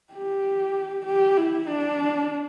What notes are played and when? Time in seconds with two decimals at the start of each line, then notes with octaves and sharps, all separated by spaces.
0.14 G4
1.06 G4
1.37 E4
1.68 D4